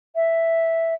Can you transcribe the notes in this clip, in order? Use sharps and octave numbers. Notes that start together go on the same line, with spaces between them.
E5